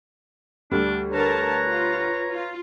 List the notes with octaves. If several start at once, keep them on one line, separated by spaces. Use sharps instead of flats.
D2 G3 D4
D3 A#4 B4 C#5 A5 A#5
F4
F4